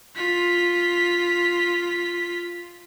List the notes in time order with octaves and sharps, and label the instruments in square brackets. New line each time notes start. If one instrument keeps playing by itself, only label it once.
[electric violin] F4 B6